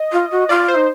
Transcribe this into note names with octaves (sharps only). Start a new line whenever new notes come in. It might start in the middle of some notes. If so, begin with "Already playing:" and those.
Already playing: D#5
F4
F#4
F4 D5
C5
D#4